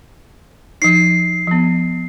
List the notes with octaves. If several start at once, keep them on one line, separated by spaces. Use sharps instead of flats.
F3 D#4 C7
F3 B3